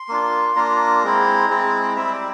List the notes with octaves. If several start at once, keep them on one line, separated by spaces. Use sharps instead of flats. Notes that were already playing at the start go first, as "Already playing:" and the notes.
Already playing: C6
A#3 D4 F4
A#3 D4 F4 A#5
G#3 C4 E4
G#3 C4 E4
G3 C4 E4 E5
D5